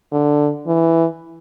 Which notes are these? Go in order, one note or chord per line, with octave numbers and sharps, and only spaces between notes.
D3
E3